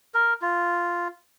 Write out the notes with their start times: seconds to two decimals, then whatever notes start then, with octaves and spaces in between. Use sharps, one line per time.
0.14 A#4
0.42 F4